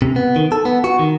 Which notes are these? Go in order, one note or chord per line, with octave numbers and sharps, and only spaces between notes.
C3
B3
D#3
A4
B3
F#4
D#3